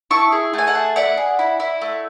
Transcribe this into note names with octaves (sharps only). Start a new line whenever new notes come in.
E4 A5 C#6
G#4
A3 G#5
F#5 A5
G#4
E4 D5 F#5
G#4
E4
E4
A3